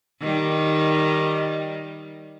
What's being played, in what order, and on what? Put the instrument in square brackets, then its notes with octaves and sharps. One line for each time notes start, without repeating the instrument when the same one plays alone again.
[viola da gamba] D#3 G3